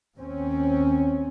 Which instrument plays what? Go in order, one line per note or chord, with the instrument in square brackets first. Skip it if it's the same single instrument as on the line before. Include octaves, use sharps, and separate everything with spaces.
[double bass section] D#2 C4 C#4